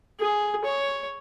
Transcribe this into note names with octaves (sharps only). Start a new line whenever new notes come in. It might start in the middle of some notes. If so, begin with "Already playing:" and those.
G#4
C#5